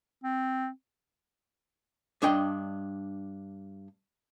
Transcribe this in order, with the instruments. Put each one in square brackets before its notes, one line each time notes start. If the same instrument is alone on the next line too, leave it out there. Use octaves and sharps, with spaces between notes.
[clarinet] C4
[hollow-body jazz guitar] G2 D4 D#5 G5